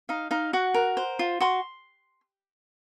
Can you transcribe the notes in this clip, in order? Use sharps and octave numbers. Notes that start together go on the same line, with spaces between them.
D#4 F5
D#4 F5
F#4 F#5
A#4
C5
F4
F#4 C6